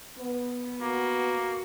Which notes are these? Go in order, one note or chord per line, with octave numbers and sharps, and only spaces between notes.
B3
A#3 F#4